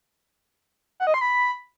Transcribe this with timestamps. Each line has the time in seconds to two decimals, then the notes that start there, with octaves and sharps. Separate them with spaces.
1.00 F#5
1.07 D#5
1.14 C6
1.21 B5